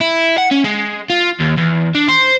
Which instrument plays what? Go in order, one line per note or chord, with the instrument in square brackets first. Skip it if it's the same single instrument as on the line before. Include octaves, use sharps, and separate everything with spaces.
[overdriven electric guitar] E4
F#5
C#4
G#3
F4
D#2
E2
D4
C5